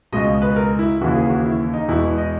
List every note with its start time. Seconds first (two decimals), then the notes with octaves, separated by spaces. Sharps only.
0.12 C#2 B2 G#3 D#5
0.42 B4
0.56 A#4
0.79 E4
1.01 D#2 C#3 E3 F#4
1.15 G#4
1.30 F#4
1.45 E4
1.74 D#4
1.88 E2 B2 G#3 E4
2.04 E4
2.18 D#5